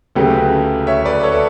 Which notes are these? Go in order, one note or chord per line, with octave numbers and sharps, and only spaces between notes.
D2 C#3 F#3 A3 G4 B4
C#5 E5
B4 D5
A4 C#5